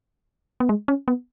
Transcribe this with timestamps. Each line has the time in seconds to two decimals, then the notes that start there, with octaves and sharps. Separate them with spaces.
0.60 B3
0.69 G#3
0.88 C#4
1.08 B3